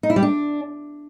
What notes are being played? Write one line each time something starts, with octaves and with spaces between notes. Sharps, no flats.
D#4
E4
G3
D4